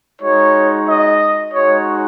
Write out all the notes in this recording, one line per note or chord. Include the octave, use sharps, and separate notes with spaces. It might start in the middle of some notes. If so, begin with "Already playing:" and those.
G#3 D#4 F#4 C#5
D#5
G#3 D#4 F#4 C#5